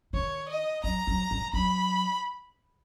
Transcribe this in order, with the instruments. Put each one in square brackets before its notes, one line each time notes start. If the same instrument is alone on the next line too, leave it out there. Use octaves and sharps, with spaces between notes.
[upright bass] D#3 [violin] C#5
[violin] D#5
[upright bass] F#3 [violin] A#5
[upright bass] F#3
F#3
[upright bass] F#3 [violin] B5